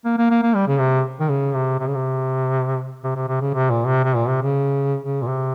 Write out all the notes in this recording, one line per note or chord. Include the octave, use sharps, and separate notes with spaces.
A#3
A#3
A#3
A#3
G3
C#3
C3
D#3
C#3
C3
C3
C#3
C3
C3
C3
C3
C#3
C3
A#2
C3
C3
A#2
C3
C#3
C#3
A#2
C3